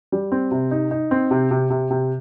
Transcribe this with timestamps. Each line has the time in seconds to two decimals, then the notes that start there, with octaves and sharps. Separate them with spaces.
0.12 G3
0.32 C4
0.51 C3
0.71 D#4
0.91 D#4
1.11 C4
1.31 C3
1.51 C3
1.70 C3
1.90 C3